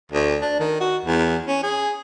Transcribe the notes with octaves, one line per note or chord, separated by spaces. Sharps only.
D2
D4
D#3
F#4
E2
C#4
G#4